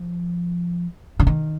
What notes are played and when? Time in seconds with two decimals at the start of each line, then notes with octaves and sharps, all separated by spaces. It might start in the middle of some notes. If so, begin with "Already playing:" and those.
Already playing: F3
1.20 D3
1.27 D#3